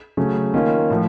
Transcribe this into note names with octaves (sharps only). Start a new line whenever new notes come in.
C#3 F#3 A3 C#4
D#3 A#3 C#4 F4
A2 F3